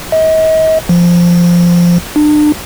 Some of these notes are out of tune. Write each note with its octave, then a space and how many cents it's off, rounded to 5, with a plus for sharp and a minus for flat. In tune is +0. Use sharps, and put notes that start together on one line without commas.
D#5 +40
F3 -5
D4 +35